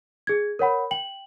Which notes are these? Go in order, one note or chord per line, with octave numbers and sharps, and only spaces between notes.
G#4 G#6
A#4 C#5 F#5 B5
G5 F#7